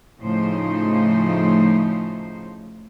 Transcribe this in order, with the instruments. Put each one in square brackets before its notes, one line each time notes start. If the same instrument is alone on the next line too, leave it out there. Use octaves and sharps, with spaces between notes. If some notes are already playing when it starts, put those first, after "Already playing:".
[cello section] A2 C#3 F3 A3 D#4 C5